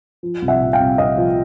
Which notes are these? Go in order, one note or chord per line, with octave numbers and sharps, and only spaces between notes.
F3
C2
E5 F#5
A#2
F5 G5
C2
C2 D#5 F5
F3